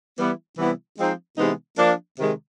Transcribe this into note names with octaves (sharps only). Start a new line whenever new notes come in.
E3 G3 B3 E4
C3 E3 G3 B3 E4
F3 G#3 C4 D#4
C3 E3 G#3 B3 D#4
F3 A#3 D4
C3 D#3 G#3